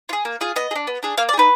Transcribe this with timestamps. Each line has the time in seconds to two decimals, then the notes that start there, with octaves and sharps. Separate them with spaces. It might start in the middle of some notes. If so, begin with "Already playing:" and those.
0.09 F4
0.13 G#4
0.25 A#3
0.41 F4 G#4
0.56 B3 D#5
0.71 G#4
0.76 D4
0.87 B3
1.03 D4 G#4
1.17 A#3 F5
1.29 D5
1.33 G#4
1.37 D#4 B4